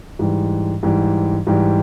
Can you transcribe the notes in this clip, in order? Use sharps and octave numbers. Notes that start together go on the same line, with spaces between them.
G#2 E3 G3
G#2 E3 G3
G#2 E3 G3